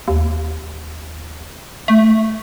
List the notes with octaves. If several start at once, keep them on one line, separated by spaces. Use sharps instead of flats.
D#2
A3